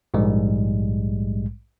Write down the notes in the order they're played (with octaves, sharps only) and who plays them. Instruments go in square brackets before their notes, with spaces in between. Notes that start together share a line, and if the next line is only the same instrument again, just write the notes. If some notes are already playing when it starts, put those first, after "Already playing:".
[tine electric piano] A#1 G#2 G3 G#3